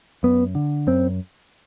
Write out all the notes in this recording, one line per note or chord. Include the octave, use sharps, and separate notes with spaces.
F#2 B3
D3
F#2 C4